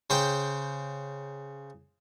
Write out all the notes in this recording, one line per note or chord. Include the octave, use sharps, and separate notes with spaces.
C#3 C5 G5